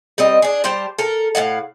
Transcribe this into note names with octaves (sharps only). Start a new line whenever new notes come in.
G3 C4 D#5
D4 G#4
G3 G4 C5 A5
A4 A#4
A2 B3 F5 F#5